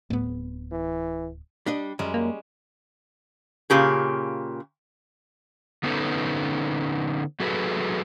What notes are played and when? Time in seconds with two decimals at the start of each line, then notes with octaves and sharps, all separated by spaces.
0.10 D1 A2 B3
0.71 E3
1.66 G3 D4 D#5
1.99 F#2 G3 G#3 C#4
2.14 A#3
3.70 A#2 C#3 G4 G#4
5.83 D3 B3 C#4 D#4 A4 B4
7.40 F#3 A3 F#4 G#4 A4 B4